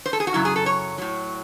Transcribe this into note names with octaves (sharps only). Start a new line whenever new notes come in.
C5
A4
G#4
F#4
F#2 C#3 F#3 E4
G#4
A4
C#5
A2 F#3